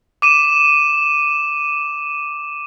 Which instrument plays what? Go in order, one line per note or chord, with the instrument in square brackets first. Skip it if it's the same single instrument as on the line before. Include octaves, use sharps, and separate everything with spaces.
[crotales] D6 D#7 E7